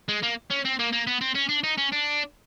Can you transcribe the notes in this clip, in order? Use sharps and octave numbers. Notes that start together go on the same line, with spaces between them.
G#3
A#3
C#4
C4
A#3
A#3
B3
C4
C#4
D4
D#4
C#4
D4